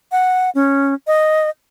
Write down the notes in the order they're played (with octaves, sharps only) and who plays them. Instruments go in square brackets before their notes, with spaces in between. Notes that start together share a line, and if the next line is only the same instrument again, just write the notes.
[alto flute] F#5
C#4
D#5